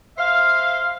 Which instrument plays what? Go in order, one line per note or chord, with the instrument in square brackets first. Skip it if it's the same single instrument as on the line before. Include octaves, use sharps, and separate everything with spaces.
[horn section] C5 E5 F5